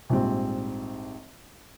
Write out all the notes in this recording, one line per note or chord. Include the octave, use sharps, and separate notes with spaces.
A#1 G#2 G3 C4